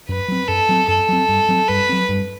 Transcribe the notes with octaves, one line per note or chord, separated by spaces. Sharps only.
F#2 B4
F#3 C4
F#2 A4
F#3 C4
F#2 A4
F#3 C4
G2
F#3 C4
G2 B4
F#3 C4
G2